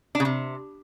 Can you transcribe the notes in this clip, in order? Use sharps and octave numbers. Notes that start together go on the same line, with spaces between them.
D4
C#3
C3